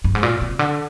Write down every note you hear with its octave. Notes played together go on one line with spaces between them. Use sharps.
G2
G#2
A#2
C3
D3